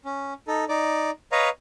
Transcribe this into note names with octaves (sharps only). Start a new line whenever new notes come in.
C#4
D#4 A4
D#4 D5
B4 C#5 D#5 F5 A#5